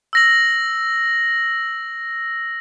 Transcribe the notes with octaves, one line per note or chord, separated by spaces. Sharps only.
E6 A#6 F#7